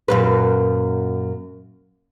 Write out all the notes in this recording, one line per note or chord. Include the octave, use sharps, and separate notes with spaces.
F#2 A#2 B4